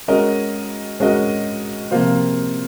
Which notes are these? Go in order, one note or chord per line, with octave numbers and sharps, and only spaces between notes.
G#3 C#4 F#4 A#4 D#5
G#3 C#4 F#4 A#4 D#5
C3 F3 A#3 F4 C5